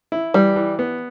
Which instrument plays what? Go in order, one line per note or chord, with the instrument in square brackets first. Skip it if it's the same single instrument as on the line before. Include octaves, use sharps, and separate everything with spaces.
[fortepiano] E4
[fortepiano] E3 [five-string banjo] G3
[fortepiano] E3
B3